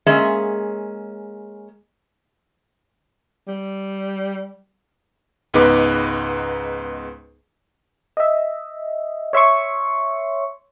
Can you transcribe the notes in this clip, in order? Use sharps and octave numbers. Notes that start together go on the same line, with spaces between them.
G#3 A#3 C#4 G#4 E5
G3
C#2 G#2 B3 D#4 B4 D6
D#5 E5
C#5 E5 C6 C#6